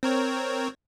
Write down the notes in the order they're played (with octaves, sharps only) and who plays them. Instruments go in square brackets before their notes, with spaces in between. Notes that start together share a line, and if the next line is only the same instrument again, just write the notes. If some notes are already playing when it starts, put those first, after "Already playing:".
[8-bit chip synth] C4 A#4 C#5